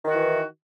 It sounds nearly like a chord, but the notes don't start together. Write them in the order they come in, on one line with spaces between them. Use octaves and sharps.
D#3 F#4 E3